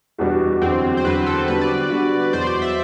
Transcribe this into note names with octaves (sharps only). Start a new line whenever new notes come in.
E2 B2 G3 D4 F#4
E2 D3 F#3 C4
C5
E2 D3 F#3 B4
A4
D3 G3 B3 F#4 B4
D5
D3 G3 B3 F#4
E2 B2 F#3 C5
D5
C5
E5